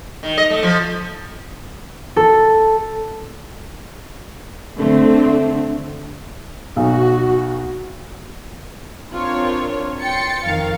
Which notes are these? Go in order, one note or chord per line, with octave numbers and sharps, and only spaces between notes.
D#3
D#5
A3
F3
A4
D3 A3 C4
B1 F#4
C4 D4 F4 A#4 C#5
G5 C6 A6 C#7
F2 D#3 A#4 F5